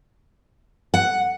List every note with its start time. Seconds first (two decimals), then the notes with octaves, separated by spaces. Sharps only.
0.94 F#5